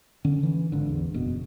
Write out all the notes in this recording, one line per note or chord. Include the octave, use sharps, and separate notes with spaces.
D3 C#4
E3
G#1 D3
E2
F#1 B2